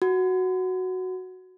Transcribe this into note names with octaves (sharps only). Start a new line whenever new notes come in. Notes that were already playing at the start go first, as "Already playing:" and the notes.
F#4